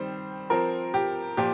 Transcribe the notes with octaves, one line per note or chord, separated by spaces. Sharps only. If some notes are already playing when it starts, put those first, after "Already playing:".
Already playing: D#3 G3 C4 C5
F3 C4 A#4
G4
A#2 F3 G4